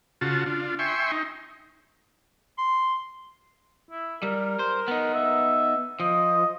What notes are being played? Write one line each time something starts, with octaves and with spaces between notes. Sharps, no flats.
C#3 F4 F#4 A5
D4 F4
E5 G5 G#5 C6 C#6
D#4
C6
E4
G3 A#4
C5
B3 D#4
E5
F3 D#5